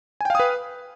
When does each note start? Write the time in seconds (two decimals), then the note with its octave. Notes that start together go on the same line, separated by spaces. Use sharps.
0.21 G#5
0.25 G5
0.30 F5
0.35 D#6
0.40 B4